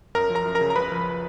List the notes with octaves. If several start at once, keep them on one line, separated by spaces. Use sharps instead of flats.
F#2 A#4 A#5
F3
A#4 A#5
F#2
A#4 A#5
C#3
A#5
C#2 B4 B5
F3